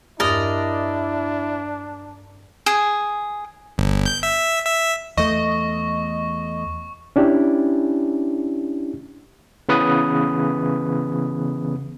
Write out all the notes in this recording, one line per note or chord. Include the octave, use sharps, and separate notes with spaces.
E2 G2 D4 E4 A#4 D5 D#5
G#4
G1
G6
E5
E5
E2 A3 D#5 C#6
C#4 D4 E4 G4
C#3 E3 B3 B4 D#6